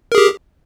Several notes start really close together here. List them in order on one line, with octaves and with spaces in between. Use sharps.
A#4 G#4 G4